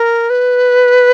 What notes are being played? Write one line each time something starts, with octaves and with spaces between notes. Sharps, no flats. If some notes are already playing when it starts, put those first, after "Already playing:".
Already playing: A#4
B4